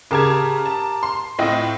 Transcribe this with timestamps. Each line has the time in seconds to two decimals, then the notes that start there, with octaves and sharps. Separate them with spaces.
0.11 C#3 G4 A#4 A5 D6 G#6
0.66 A5
1.03 C6
1.39 A2 C4 F4 D#5 A#6